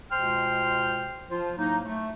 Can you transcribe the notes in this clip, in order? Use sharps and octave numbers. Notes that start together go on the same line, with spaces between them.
C#2 B2 C5 G5 C6 F6
F3 F4 C5
A2 F#3 A#3 D#4
A3